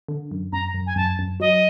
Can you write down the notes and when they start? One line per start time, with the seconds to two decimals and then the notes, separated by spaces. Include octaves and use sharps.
0.08 D3
0.31 F#2
0.52 F#2 A#5
0.74 F#2
0.86 G#5
0.96 F#2 A5
1.19 F#2
1.40 F#3 D#5